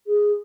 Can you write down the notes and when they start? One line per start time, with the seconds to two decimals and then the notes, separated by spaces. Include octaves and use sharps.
0.07 G#4